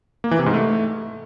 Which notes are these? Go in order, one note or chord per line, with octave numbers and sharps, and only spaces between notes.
A#3
E3
C3
G#2
A3